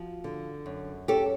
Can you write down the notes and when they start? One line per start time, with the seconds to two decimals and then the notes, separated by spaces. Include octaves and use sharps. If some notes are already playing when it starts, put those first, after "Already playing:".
Already playing: F3 F#4
0.24 D3
0.66 F#2
1.08 C#4 G4 A4